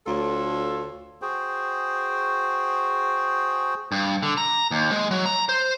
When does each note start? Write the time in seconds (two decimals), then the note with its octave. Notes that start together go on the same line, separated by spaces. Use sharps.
0.07 D2 F4 A4 C#5
1.22 F#4 G#4 C5 G5
3.92 G2
4.23 D3
4.37 A#5
4.71 D#2
4.92 G#3
5.11 F#3
5.26 A#5
5.49 C5